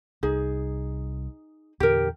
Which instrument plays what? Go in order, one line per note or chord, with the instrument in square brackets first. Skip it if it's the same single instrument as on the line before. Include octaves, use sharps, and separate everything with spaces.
[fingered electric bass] C2 [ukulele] D#4 G#4
[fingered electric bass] E2 A#2 D3 [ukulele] G4 A#4